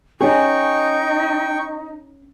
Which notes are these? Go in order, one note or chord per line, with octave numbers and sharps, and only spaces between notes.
C#4 D#4 G#4 G5 C#6